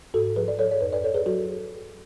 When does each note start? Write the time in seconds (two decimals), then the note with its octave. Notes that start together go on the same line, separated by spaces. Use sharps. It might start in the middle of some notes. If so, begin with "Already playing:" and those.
0.14 G#2 F#4 A4
0.36 F3 G#4 B4
0.48 D5
0.59 F3 A4 C#5
0.72 C#5
0.81 F2 B4 D5
0.92 B4 D5
1.04 F2 A4 C#5
1.14 G#4 B4
1.26 F#3 F#4 A4